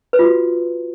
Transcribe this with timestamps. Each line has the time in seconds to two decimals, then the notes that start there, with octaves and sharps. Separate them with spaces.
0.13 B4
0.19 F4
0.25 F#4